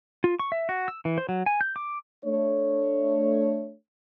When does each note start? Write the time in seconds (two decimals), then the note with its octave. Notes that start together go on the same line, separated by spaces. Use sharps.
0.24 F4
0.39 C#6
0.52 E5
0.69 F#4
0.88 E6
1.05 E3
1.18 C5
1.29 F#3
1.46 G#5
1.61 G6
1.76 D6
2.25 A3 D4 C#5